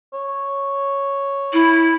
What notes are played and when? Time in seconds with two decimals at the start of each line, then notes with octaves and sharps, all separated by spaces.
0.14 C#5
1.53 E4